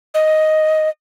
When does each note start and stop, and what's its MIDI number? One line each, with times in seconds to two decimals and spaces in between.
0.14 0.89 75